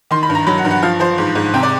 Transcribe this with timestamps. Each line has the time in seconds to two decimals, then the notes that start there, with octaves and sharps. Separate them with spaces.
0.11 D#3 C6
0.23 B5
0.30 G2
0.35 A#5
0.47 F#3 B5
0.58 F#5
0.65 G2
0.71 F#5
0.82 F3 F5
1.00 F3 C5
1.18 G#2
1.35 G#2
1.54 C3 G5
1.63 D5